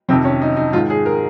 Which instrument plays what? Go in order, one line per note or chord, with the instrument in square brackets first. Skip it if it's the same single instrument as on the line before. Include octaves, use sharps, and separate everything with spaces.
[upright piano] F2 C3 D#3 C4
C#4
D#4
D#4
G#2 D#3 F4
G#4
A#4